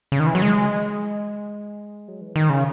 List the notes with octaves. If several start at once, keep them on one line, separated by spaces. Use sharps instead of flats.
C#3
D#3
E3
F#3
G#3
F#3
E3
D#3
C#3